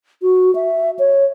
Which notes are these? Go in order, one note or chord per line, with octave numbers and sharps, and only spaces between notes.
F#4
E5
C#5